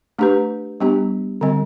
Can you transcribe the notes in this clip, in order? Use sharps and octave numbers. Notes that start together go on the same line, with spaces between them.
A3 D4 G4 B4
G3 B3 D4 G4
D3 G3 C4